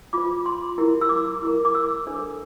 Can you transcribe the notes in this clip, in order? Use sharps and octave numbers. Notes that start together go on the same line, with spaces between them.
F4 C5 D6
C6
E4 G4 A#4
E6
D6
E4 G4 A#4
D6
E6
D4 A4 C5